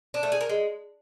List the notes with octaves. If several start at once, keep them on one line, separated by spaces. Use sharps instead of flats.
D4
A3
G#4
A#4
G#3